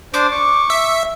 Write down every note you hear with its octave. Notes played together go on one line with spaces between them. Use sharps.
D4 C5 D6
C#6
E5